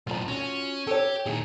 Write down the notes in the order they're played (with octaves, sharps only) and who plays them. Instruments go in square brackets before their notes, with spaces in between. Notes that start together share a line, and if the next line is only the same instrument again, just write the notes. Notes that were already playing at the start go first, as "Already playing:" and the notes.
[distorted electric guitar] B1 A2 [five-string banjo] F4 B5
[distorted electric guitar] C#4 [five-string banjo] F4 F#4
[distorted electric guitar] G4 [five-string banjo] A4 C#5
[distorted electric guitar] A#2 D#3 [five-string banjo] E4 G#4